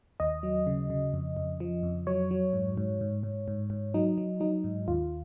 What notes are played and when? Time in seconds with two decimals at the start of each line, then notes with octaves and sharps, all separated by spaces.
0.20 D#2 D#5
0.43 F#3
0.67 C#3
0.90 C#3
1.14 F2
1.37 F2
1.60 F3
1.83 F2
2.07 F#3 C#5
2.31 F#3
2.53 G#2
2.77 G#2
3.01 G#2
3.23 G#2
3.48 G#2
3.70 G#2
3.94 F#3 D#4
4.18 F#3
4.40 F#3 D#4
4.64 G#2
4.88 D#2 F4